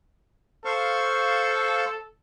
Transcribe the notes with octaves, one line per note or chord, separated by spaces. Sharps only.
A4 C5 F5 C#6